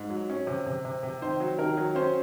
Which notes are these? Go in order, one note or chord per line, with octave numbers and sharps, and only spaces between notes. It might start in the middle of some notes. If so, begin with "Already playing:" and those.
Already playing: G#2
F#3
C#4
C3
C3
C3
C3
D#3 C5
F#3
D#3 A#4
F#3
C#4 C5